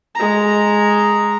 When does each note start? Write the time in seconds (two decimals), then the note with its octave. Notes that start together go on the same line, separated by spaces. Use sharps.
0.15 G#3 A#5